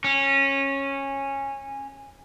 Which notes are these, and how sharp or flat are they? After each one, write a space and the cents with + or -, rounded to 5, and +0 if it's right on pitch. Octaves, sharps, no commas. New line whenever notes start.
C#4 -15